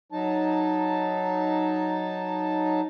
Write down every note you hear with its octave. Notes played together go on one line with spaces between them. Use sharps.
F#3 D#4 A5